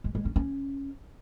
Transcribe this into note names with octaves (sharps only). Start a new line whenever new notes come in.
G#3
G#3
C#4
C#4